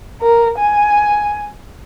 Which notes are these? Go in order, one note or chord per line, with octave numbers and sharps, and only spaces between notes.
A#4
G#5